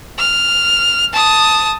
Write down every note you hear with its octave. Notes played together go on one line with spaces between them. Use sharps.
F6
A5 D#6